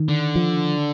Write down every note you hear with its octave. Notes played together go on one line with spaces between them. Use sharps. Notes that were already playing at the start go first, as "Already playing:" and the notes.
Already playing: D#3
D3
F3